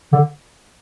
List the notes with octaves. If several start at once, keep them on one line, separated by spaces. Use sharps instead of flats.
D3